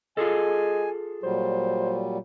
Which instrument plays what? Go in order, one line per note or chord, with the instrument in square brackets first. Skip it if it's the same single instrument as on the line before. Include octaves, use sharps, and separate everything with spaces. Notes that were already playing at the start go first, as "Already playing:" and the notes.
[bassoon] G#3 [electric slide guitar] F4 G#4 A4 [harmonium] G#5
[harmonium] A#2 F#3 G3 [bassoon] C5